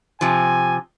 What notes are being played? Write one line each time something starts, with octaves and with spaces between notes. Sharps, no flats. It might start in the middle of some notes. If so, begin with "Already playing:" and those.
C3 F3 G#5